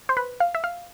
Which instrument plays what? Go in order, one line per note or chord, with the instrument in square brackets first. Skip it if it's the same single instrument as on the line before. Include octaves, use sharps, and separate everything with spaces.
[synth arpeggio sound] C5
B4
F5
E5
F5